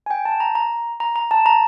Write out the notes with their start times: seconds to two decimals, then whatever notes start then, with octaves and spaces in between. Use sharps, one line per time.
0.06 G#5
0.11 G5
0.25 A5
0.40 A#5
0.55 A#5
1.00 A#5
1.16 A#5
1.31 A5
1.46 A#5